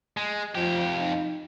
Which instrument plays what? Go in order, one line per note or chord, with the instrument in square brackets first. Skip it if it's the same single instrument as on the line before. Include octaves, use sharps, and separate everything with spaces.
[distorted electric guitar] G#3
[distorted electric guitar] F2 G4 [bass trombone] F3
[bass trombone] D#4